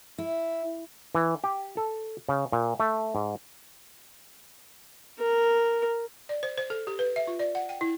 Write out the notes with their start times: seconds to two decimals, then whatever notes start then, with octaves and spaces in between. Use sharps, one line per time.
0.18 E4
1.15 E3
1.44 G4
1.77 A4
2.29 C#3
2.52 A#2
2.80 A3
3.15 G#2
5.19 A#4
6.29 D5
6.43 C5
6.57 C5
6.70 A4
6.87 G4
6.99 B4
7.16 E5
7.27 F4
7.39 D5
7.55 F#5
7.69 G5
7.81 E4